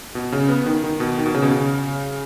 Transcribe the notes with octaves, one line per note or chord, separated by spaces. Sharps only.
B2
C#3
B3
D#3
D#3
B2
D#3
B2
C#3
B2
C#3